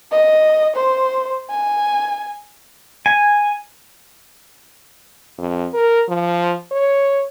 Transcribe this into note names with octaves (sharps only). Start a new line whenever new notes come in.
D#5
C5
G#5
G#5
F2
A#4
F3
C#5